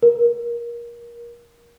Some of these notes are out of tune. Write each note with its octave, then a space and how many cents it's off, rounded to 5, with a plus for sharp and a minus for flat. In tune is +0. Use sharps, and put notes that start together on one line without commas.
A#4 +25